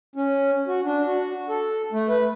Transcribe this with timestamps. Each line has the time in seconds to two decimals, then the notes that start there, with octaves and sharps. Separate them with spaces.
0.16 C#4
0.67 F#4
0.84 D4
1.05 F#4
1.49 A4
1.92 A3
2.08 B4